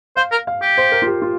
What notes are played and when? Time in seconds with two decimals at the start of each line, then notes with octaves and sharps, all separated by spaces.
0.17 C5 F5
0.32 A#4
0.47 F5
0.62 G4
0.77 C5
0.92 A#4
1.02 F4
1.07 G4
1.22 F4